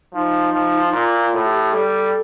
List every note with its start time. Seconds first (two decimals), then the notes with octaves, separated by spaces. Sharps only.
0.13 F3 D#4
0.53 F3
0.93 A#2 F4
1.20 F4
1.33 A2
1.42 F4
1.46 G4
1.72 G3 A4